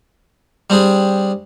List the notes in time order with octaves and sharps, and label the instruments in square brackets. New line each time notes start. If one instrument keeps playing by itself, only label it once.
[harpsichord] G3 C4 D4 G#4